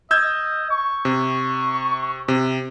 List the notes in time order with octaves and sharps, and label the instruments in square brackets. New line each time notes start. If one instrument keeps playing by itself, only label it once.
[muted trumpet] D#5 [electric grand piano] E6 G6 G#6
[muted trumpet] C#6
[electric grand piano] C3
C3